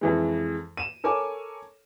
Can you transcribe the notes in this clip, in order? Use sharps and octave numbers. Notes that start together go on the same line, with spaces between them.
F2 E3 G#3
D#7 E7
A4 A#4 C#5 G#5 D6